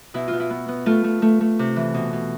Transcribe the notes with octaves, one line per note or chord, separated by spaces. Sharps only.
B2 E4
F4
B2
E4
B3
B3
A3 F4
A3
A3
A3
C3
E3
B2
B2